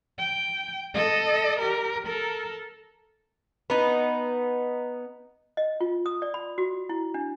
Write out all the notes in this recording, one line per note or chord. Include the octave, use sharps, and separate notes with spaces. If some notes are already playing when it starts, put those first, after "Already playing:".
G5
A4 D#5
G4 A#4
A4 A#4
B3 D#4
D#5
F4
D#6
D5
B5
F#4
E4
D4